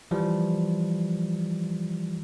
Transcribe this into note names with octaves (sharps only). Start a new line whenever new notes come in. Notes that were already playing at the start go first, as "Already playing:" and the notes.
E3 F3 G3